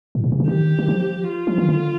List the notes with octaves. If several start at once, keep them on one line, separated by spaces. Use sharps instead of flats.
A2
A#2
C3
D3
D#3 G4
D#3
F3
F4
F3
D#3
D3